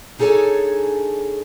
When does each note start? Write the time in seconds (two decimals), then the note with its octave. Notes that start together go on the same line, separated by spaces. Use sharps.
0.19 D4 D#4 G#4 A4 C#5 G#5